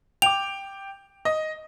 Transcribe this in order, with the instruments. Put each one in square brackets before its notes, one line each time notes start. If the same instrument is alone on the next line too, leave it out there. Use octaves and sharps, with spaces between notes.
[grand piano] G5 D6 [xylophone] F7
[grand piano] D#5